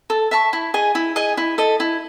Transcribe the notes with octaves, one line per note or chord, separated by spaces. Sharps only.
A4
E5 A5 C#6
E4
G#4 D#5 G#5
E4
G#4 D#5 G#5
E4
A4 D#5
E4